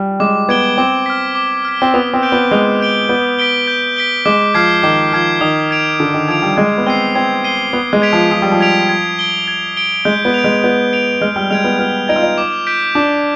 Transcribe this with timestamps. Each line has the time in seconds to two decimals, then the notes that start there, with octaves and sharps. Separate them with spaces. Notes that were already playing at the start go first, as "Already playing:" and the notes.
Already playing: G3
0.20 G#3 D6
0.49 B3 G#6 D7 G7
0.78 C4 D6
1.06 F6 B6
1.35 D6
1.65 F6 B6
1.82 C4
1.94 B3 D#6
2.13 C4
2.22 G6 D7 G7
2.32 B3
2.51 G#3 D#6
2.80 G6 D7 G7
3.09 B3 G6
3.39 B6 D7 G7
3.67 G6
3.96 B6 D7 G7
4.26 G#3 D6
4.54 F3 F6 G#6 C7
4.83 D#3 D6
5.13 F3 F6 G#6 C7
5.41 D#3 D#6
5.71 G#6 D7 F7
6.00 D3 D#6
6.14 D#3
6.28 F3 G#6 D7 F7
6.42 G3
6.57 G#3 G#6
6.78 B3
6.86 C4 C7 D#7 G7
7.15 C4 G#6
7.44 C7 D#7 G7
7.73 B3 D#6
7.93 G#3
8.02 G#6 B6 D7 F7
8.13 F3
8.31 F3 D#6
8.42 G3
8.52 F3
8.61 G#6 B6 D7 F7
8.89 G#6
9.19 D7 G7
9.48 G#6
9.77 D7 G7
10.05 G#3 G6
10.25 B3
10.34 D7 F7
10.44 G#3
10.64 B3 G6
10.93 D7 F7
11.21 G#3 F6
11.36 G3
11.51 G#3 G#6 D7 F7
11.64 B3
11.79 B3 F6
12.08 D#4 G#6 D7 F7
12.16 F4
12.23 D#4
12.38 D6
12.67 G6 B6 D7
12.95 D4 D6